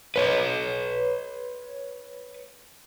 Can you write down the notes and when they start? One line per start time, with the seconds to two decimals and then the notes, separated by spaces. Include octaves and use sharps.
0.16 B4 C#5